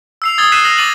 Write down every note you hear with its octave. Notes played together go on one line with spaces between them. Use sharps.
E6 C7 F7
D#6 G#6 A6 G7
E6 F#6 B6 C7 D#7 E7
F6 A#6 B6 F7 F#7
D6 A6 D#7 F#7